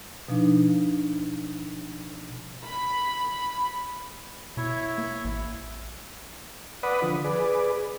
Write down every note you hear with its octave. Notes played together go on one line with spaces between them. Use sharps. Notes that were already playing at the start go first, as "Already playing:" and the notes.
B2 F3 D4 D#4
B5
B2 E4 C#5 E5
A#3
A1
B4 D5 F#5 B5 D#6
D3 F3
G#4 B4 D5